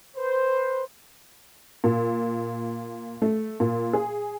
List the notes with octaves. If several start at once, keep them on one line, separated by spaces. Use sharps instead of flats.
B4 C5
A#2
A3
A#2
G#4